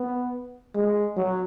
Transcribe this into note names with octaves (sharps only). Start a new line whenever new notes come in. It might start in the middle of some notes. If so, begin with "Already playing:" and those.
Already playing: B3
G#3
F#3